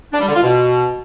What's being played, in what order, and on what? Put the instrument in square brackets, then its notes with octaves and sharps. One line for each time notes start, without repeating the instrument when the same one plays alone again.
[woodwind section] D4
G3
D3
F4
B2